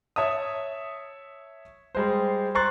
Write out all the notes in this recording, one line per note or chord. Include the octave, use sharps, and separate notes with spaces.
C#5 E5 A5 D#6
G3 G#3 C5
C5 A#5 C6 C#6 F#6 A6